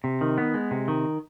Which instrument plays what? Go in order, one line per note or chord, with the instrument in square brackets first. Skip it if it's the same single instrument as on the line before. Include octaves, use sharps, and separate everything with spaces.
[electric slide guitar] C3
D#3
B3
G#3
C3
D#3